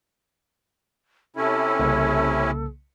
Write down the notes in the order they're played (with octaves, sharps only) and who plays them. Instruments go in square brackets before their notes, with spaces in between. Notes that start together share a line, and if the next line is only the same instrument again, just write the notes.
[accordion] C3 C#4 E4 [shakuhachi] A4
[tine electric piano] C2 C#3 A#3